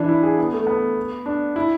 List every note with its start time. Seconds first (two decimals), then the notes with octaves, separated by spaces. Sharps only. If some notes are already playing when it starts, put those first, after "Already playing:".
Already playing: E3 D4
0.09 E4
0.23 G#4
0.38 B3
0.53 A3
0.67 B3
1.26 D4
1.56 E4